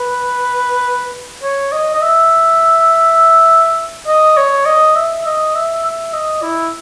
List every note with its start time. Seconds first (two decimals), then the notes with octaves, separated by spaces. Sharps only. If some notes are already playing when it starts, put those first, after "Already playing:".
Already playing: B4
1.43 C#5
1.73 D#5
1.95 D#5
2.02 E5
4.07 D#5
4.37 C#5
4.66 D#5
4.95 E5
5.26 D#5
5.55 E5
5.85 E5
6.13 D#5
6.43 E4